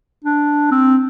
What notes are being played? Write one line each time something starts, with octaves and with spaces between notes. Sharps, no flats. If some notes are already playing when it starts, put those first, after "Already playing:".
D4
C4